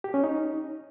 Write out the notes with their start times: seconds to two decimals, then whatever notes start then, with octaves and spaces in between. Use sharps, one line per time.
0.04 G4
0.14 C#4
0.24 D#4